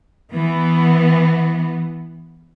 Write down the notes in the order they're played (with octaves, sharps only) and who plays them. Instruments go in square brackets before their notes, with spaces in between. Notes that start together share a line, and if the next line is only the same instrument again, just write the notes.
[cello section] E3 B3